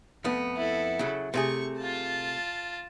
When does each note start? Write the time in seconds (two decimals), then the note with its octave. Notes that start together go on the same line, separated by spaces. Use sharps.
0.24 F2 A3 B3
0.56 E4 A4
0.99 C#3 F#3
1.34 C3 A3 G#4 C#6
1.79 F4 A5